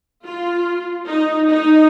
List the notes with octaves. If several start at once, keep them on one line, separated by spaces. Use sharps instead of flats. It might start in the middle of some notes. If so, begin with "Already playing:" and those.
F4
D#4
D#4